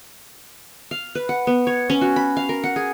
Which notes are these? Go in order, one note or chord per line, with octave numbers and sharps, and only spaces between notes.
F5
B4
F#5
B3
C#5
C#4
F#4
B5
F5
A#4
F#5
G#4